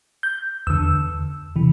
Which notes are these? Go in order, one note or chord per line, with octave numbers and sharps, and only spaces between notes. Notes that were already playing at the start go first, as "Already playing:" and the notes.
G6
E2 D3 E6
C3 E3